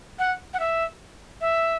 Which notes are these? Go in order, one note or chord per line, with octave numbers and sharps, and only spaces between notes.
F#5
F#5
E5
E5